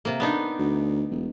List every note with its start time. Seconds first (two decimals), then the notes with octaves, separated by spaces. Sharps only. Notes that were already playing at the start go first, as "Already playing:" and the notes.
0.05 C3 A#3
0.20 B3 D4 D#4
0.58 D2
1.11 E1